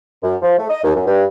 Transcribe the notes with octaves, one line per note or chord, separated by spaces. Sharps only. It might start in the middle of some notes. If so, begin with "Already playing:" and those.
F#2
F3
A3
D#5
D#2
F#2
G2